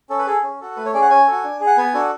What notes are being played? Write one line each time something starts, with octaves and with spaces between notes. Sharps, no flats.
C#4 A4
B4
G#4 A4
C#4
F#4 A4
A3 B4
C#5
C#4 G#4 D5
F#5
C#4 G#5
F#4 A4
D4
G#4
F#5
B3 G#5
D4 F#4 A4